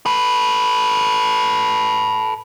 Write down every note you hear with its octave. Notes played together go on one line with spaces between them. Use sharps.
A4 B4